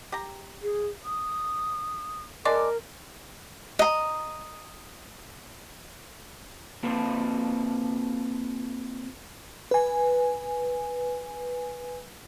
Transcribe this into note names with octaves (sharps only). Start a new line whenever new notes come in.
G4 A#5
G#4
D#6
G#3 D4 A#4 D5
D#5 A#5
A#3 C4 F4 A4 B4 C5
B4 G#5